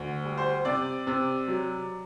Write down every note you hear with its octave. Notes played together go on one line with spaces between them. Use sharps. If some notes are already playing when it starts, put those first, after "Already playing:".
Already playing: D2
G3
C5
C3 D5
C3
F#3